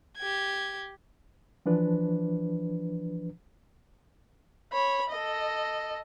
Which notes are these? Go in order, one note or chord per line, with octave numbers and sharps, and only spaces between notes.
G4 G#6
E3 F3 D4 B4
C#5 B5
A4 D#5